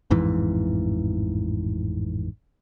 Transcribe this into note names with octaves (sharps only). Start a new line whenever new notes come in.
A1 F2 G#2 E3